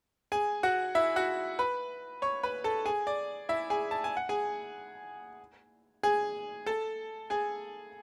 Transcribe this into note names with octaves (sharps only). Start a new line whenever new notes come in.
G#4 G#5
F#4 F#5
E4 E5
F#4 F#5
B4 B5
C#5 C#6
B4 B5
A4 A5
G#4 G#5
D5
E4 E5
G#4 G#5
A5
G#5
F#5
G#4 G#5
G#4 G#5
A4 A5
G#4 G#5